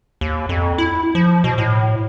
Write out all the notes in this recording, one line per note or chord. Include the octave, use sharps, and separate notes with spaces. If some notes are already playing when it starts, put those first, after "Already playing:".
D#2
F2
E4
F3
B2
A2